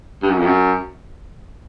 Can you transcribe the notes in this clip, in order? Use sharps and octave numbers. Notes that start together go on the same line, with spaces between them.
G2
F#2
F2
F#2